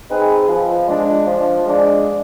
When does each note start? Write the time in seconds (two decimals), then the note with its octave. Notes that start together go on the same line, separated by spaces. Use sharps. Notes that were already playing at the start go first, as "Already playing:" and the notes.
0.10 C4 D#4 G#4 B4
0.49 F3
0.88 G#3 D4
1.27 F3
1.66 G#3 D4